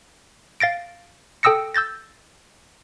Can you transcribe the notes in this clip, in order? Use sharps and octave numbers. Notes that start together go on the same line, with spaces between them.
F5 A6 A#6 D7
A4 G5 D#6 E6 A#6 C#7
E6 G6 A6 A#6